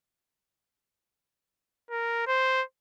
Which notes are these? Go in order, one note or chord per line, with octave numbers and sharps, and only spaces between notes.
A#4
C5